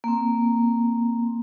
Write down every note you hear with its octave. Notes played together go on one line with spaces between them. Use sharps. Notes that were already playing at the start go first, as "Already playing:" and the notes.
A#3 C4